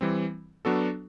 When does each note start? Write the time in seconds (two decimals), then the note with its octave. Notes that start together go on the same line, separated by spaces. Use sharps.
0.01 E3 G3 C4
0.65 F#3 B3 D4 F#4 A4